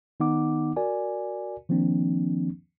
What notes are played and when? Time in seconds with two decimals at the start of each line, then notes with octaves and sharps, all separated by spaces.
0.20 D#3 B3 D#4 F#5 D6
0.76 F#4 A#4 D5 G#5
1.69 D#3 F3 A#3 C4 D4